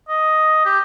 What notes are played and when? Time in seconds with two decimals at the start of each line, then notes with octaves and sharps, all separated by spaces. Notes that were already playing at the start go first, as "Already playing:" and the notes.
0.09 D#5
0.65 G4